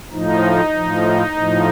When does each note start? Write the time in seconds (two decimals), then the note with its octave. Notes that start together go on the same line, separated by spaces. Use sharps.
0.11 A2 F3 D#4
0.73 A2 F3
1.36 A2 F3